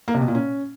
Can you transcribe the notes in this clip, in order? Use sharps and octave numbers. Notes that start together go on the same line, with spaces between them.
A#3
C3
B2
A#2
C#4